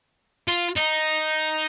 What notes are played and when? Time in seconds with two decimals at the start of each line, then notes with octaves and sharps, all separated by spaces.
0.48 F4
0.76 D#4